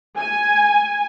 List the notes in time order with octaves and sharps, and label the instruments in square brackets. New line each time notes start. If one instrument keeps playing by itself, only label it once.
[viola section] G#5